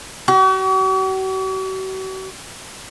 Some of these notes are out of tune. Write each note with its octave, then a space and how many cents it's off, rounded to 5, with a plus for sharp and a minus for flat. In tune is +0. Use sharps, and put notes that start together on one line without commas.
F#4 +45